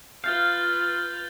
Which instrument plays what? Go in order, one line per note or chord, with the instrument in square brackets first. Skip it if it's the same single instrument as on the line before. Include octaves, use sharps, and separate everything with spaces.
[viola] F4 B4 [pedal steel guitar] F5 [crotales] G6 A6 G7